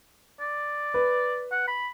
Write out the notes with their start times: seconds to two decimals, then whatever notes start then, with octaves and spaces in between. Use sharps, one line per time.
0.40 D5
0.94 B4
1.52 F#5
1.67 B5